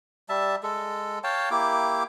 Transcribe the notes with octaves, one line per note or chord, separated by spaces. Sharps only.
G3 E5 A5
G#3 A4
C#5 F5 G5 A5
A#3 E4 G4 D6